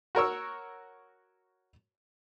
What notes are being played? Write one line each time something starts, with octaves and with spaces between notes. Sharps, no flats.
F#4 A#4 C#5 E6